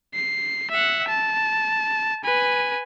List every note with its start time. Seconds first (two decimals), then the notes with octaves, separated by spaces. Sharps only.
0.14 C7
0.71 E5 F#5
1.09 A5
2.24 B4 G#5